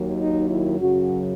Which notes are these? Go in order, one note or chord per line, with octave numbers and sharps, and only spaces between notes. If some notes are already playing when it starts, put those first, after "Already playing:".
Already playing: D#2 D#3 F#3
D#4
E4
F#2 C#3 F#3 F#4